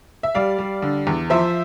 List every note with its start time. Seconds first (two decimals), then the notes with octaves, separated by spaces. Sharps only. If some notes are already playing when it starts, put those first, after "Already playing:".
0.23 E5
0.35 G3 D5 F5
0.58 G3
0.82 D3
1.07 E2
1.30 F3 C5 E5